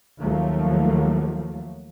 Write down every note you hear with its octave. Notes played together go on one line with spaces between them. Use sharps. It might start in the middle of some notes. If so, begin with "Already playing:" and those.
D#2 F3 F#3 A3 A#3